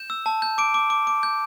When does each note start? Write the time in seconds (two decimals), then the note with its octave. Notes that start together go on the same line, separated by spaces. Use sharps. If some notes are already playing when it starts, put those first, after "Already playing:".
Already playing: G6 E7
0.10 E6
0.26 A5
0.42 G6
0.58 D6 D7
0.74 D6
0.90 D6
1.07 D6
1.23 G6